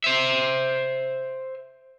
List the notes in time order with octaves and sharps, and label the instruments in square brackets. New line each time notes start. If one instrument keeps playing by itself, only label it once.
[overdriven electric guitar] C5 E5